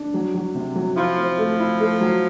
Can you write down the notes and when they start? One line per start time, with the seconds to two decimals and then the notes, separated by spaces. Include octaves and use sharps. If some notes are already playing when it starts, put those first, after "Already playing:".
Already playing: D4
0.14 F#3
0.35 F#3
0.55 C3
0.76 F#3
0.96 F3 E4
1.17 C4
1.38 A3
1.59 E4
1.80 A3
2.01 F#3